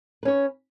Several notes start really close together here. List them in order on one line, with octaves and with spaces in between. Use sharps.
B4 C#4 C#5